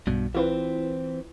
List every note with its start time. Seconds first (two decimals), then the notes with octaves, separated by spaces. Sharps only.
0.07 B1 G2 B2
0.35 E3 C4 E4 F4 B4